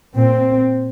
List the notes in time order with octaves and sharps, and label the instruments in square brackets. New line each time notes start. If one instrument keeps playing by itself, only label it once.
[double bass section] A#2 C4